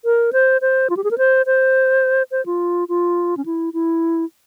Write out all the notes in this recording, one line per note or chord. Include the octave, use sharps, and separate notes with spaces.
A#4
C5
C5
F4
G4
G#4
A#4
C5
C5
C5
F4
F4
C#4
E4
E4